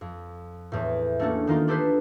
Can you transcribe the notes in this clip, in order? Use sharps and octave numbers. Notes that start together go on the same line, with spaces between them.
F2
E2 A2
A3 A#3 C#4 D4 F#4 A4
D#3 A#3 D#4 F4
D4 G4 A4 B4 C5